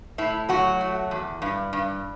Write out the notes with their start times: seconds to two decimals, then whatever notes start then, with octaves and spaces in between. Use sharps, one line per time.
0.18 A2 E4
0.49 F#3 F#4
0.81 A3
1.11 E2
1.42 G2
1.73 G2